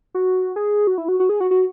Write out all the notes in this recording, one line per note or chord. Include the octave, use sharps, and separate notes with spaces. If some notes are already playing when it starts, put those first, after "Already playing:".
F#4
G#4
F#4
E4
F#4
F#4
G#4
F#4
F#4